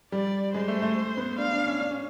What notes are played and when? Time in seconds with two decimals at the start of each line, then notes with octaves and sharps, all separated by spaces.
0.12 G3 D5
0.54 G#3 C5
0.68 A3
0.82 A3
1.17 B3
1.38 D4 F5
1.52 D4
1.67 C#4
1.81 D4
1.91 C#4